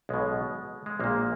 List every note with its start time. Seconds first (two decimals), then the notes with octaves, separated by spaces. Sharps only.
0.09 B1 B2 G#3
0.86 G#3
1.00 A#1 A#2 A#3